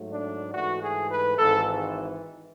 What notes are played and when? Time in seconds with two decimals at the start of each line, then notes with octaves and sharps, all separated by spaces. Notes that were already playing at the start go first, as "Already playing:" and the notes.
Already playing: G#2 F#3 A3
0.11 D4
0.53 G#2 E3 A3 F#4
0.81 G#4
1.09 B4
1.37 G#1 G#2 E3 A4